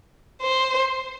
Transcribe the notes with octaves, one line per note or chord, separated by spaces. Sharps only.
C5